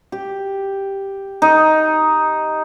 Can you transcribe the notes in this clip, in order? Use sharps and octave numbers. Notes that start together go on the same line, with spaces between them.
G4
D#4